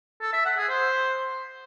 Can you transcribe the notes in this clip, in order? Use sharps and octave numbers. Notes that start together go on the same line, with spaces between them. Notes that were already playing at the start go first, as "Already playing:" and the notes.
A4
E5
F#5
G#4
C5